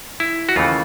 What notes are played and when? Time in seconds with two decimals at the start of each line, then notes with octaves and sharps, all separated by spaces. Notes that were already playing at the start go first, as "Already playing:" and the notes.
0.20 E4
0.49 F#4
0.56 D#2 C#3 E3 A3 F4